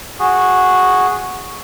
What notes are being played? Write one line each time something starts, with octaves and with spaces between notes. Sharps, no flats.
F#4 G#4